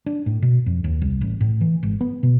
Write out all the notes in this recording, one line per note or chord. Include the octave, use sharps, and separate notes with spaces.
D4
A2
B2
F2
D#2
C2
A1
A2
E3
G#1
B3
B2